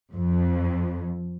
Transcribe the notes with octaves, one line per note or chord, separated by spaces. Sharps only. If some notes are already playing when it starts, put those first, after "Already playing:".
F2